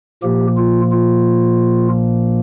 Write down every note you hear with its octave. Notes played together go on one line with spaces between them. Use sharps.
A#2 F3 A#3 G4
F4
F4